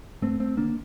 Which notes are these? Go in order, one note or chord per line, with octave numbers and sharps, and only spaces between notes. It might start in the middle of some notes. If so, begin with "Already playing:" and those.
G2 A3 C4
A3 C4
D3 A#3 D4